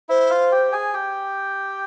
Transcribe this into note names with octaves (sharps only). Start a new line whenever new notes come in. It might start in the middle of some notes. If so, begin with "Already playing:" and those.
E4 C5 E5
F4 F5
G4 G5
G#4 G#5
G4 G5